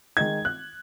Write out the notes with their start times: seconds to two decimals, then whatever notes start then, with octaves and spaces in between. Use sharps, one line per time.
0.17 D#3 G#3 D#4 G#6
0.45 F#6